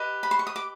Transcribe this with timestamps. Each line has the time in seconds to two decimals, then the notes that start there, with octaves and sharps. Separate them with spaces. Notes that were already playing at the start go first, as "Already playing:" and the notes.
Already playing: G4 B4 D#5
0.23 B5
0.31 C6
0.39 C#6
0.47 D#6
0.56 D6